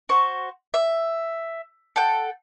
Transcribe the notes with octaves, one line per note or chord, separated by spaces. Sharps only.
F#4 C5 C#6
E5
A4 F#5 G5